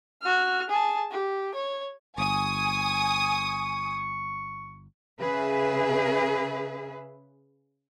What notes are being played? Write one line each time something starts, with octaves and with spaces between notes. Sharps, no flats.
F#4 F6
G#4 A5
G4
C#5
G1 G#5 C#6 D#6
C#3 G#4 B4 E5